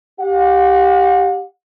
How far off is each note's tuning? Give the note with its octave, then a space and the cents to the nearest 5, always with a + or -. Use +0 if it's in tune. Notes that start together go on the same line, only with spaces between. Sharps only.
G4 +0 F#5 -45